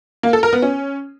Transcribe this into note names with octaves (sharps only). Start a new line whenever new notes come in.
A#3
A4
A#4
B3
C#4